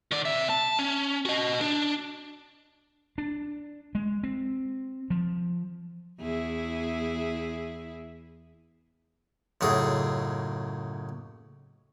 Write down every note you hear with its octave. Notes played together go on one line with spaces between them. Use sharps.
D#3 D5
C3 E5
A5
C#4
F#4 D#5
D4
D4
G#3
C4
F3
E2 E4 G#4
C#2 F#2 A2 G#4